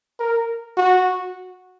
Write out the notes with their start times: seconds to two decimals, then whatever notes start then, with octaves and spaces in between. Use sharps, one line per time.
0.20 A#4
0.77 F#4